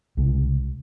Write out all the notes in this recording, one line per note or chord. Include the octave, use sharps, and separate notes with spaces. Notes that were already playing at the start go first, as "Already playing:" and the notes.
C2 C#3 G#3